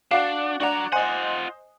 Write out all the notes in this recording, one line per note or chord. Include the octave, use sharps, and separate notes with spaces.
D4 F#4 D5 F5 F#5
D4 F#4 D5 F#5 A#5
F4 C5 D#5 F#5 G#5